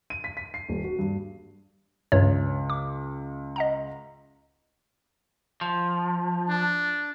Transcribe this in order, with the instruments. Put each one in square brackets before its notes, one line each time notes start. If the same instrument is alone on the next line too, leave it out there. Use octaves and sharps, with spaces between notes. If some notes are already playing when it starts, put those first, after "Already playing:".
[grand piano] D#7
B6
B6
C7
D#1
F#4
G2
[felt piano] C#2 [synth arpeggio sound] G2 C#5
[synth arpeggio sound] D6
D#5 F#5 A#5
[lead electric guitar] F3
[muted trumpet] D4